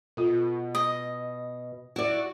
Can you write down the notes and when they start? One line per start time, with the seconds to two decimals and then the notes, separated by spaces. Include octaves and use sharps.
0.17 B2 F4 A4
0.75 D#5
1.96 E4 F#4 D5